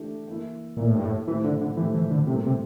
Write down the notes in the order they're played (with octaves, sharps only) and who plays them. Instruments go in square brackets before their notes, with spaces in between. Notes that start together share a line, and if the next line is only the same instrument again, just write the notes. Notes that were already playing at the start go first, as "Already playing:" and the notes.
Already playing: [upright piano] E3 A3 D4 G4
E3 A#3 E4
[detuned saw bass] A#2 [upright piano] E3 A#3 E4
[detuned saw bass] A2
G2
A2
[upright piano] A2 F3 A3 C4 G4 [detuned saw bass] E3
[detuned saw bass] D3
D3
[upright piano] A2 F3 A3 C4 G4 [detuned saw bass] E3
[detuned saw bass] E3
D3
[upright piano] A2 G3 A#3 E4 [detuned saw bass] C3
[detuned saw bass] C3